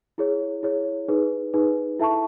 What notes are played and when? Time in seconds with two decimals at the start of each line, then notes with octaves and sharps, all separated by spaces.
0.18 E4 G#4 C#5
0.63 E4 G#4 C#5
1.08 D#4 G#4 B4
1.54 D#4 G#4 B4
1.99 E4 A4 E5 A5 C#6